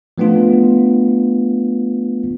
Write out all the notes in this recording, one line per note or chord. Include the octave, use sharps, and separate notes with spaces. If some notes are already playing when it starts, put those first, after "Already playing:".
F3 A3 B3 D4 F4